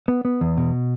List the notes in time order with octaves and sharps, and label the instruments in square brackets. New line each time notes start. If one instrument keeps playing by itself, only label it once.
[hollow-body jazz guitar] B3
B3
E2
B2